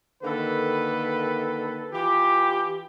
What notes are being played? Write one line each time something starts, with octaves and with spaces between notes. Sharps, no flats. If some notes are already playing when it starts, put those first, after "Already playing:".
D3 D#3 A#3 A4 B4
E3 F4 G4